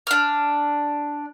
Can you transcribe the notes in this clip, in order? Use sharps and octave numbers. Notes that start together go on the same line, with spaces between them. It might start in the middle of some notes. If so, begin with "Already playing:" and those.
D4 F6